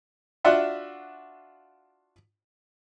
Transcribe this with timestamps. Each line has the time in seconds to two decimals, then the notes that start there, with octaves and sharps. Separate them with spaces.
0.45 D4 F4 F#4 E5 F#5 C6